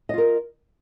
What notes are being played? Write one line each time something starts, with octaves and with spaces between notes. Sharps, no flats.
F4 A#4 D#5